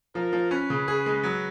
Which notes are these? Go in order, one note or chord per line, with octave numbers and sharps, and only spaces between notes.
F3 A#4
F3
C#4 B4
C#3
G#4
G#3
F#3